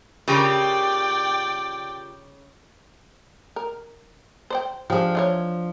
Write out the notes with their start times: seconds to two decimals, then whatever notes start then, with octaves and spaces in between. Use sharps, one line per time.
0.28 C#3 F4 G4 A#4 D5 G5
3.56 A#4
4.50 C5 D5 G5
4.90 F3 D4 G4 G#4
5.15 E3 F4 C#5